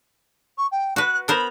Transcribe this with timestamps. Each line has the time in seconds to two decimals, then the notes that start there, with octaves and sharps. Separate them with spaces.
0.57 C#6
0.71 G5
0.96 F#4 B4 F#6
1.28 B3 A#4 C5 B5